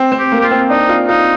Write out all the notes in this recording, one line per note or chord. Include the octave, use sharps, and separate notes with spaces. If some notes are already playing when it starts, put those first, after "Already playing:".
Already playing: C4
C4
G4
A#3
G4
F4
C4
D4 D#4
F4
D#4 F4